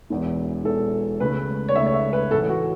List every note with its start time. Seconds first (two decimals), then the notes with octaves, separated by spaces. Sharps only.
0.10 E1 E2 E3
0.65 E1 E2 E3 A4
1.20 C#2 C#3 A3 B4
1.68 C#5
1.75 C#2 C#3 A3 E5
1.86 C#5
1.94 E5
2.13 B4
2.31 A1 A2 E3 A4
2.49 F#4